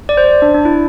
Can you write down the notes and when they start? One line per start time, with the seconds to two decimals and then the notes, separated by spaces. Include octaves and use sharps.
0.09 D5
0.17 C5
0.42 D4
0.54 D4
0.65 E4